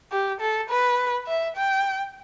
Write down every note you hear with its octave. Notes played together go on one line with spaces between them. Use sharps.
G4
A4
B4
E5
G5